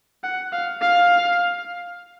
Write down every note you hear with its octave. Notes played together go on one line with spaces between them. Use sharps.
F#5
F5
F5